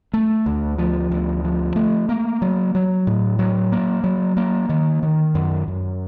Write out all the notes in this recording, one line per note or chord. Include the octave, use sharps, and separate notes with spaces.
A3
D2
F3
D2
F3
A3
A#3
F#3
F#3
A2
F#3
A#3
F#3
A#3
D#3
D#3
F#2
F#2